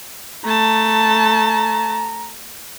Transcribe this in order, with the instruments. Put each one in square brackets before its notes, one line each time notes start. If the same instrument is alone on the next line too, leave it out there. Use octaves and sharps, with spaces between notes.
[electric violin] A3 A5 [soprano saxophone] A#5